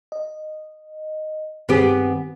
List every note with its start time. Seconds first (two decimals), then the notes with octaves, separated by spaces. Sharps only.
0.12 D#5
1.69 G2 D#3 B3 C4 G4 G#4